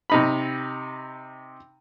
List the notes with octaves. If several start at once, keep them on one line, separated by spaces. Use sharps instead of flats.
C3 D#4 B5